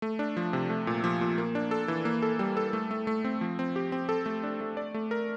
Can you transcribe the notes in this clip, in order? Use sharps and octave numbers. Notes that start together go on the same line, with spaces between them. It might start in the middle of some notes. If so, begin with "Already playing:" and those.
A3
D4
F3
C3
A3
A#2
F3
A#2
A#3
D4
A4
E3
A#3
A4
G3
A4
A3
A3
A3
C4
F3
C4
G4
C4
A4
A3
D4
A3
D5
A3
A#4